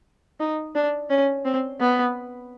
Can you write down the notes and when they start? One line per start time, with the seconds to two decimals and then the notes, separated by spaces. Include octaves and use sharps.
0.40 D#4
0.75 D4
1.10 C#4
1.45 C4
1.80 B3